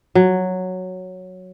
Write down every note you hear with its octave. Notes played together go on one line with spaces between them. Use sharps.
F#3